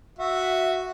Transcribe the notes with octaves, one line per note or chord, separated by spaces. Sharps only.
F#4 E5